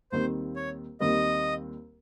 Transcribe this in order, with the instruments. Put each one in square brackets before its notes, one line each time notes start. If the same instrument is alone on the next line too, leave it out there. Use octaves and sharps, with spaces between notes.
[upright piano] D#2 D#3 G3 C4 [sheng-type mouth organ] C5
[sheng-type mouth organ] C#5
[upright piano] D#2 D#3 G3 C4 [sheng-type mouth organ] D#5